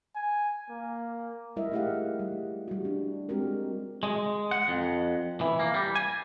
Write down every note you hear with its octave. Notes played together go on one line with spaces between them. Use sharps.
G#5
A#3
G3 G#3 E4 A#4 D#5 E5
A3 D#4 G4 G#4 F5 F#5
G3
G3 F#4
D4
G#3 C4 F#4 G4 A#4
G#3
F#5
F2
E3
A#3
G3
G#5